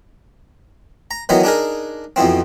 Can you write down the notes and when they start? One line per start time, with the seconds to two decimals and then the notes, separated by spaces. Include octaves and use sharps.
1.11 A#5
1.29 D#3 E3 F#3 B3 D#4
1.43 D4 D#4 G#4 A#4
2.16 F2 B2 E3 C4